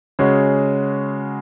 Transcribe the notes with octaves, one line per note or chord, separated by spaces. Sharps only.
C#3 G#3 C#4 F#4